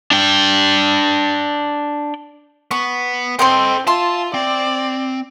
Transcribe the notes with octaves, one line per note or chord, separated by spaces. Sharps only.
D4 G5
B3 C#6
C4 A4 C5 D#5 G5 C6
F4 E5 A5 C6
C4 D5